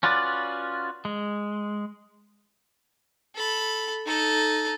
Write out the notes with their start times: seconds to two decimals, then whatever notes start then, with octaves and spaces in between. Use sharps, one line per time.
0.03 C#4 F4 F#4 B4 D5
1.05 G#3
3.35 A4 B5
4.06 D#4 A4